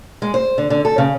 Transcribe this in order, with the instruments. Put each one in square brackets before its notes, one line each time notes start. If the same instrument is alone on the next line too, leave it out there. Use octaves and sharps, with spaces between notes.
[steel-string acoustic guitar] G#3
C5
D3
D3
A4
C#3